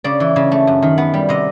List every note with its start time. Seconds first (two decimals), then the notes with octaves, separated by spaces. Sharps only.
0.04 C#3 D5
0.20 E3
0.36 C#3
0.52 A3
0.67 F#2
0.82 D#3
0.98 B3
1.14 G3
1.29 C3 D#5